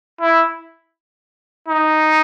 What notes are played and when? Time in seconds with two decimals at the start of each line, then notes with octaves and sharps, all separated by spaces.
0.21 E4
1.68 D#4